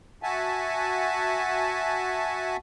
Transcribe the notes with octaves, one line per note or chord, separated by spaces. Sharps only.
F#4 E5 F#5 G#5 A5